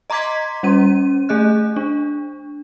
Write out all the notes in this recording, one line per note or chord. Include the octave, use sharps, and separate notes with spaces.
D#5 A#5 C6 D6 G#6 B6
G3 C#4 D#7
A3 G#4 D#5 F#6
D4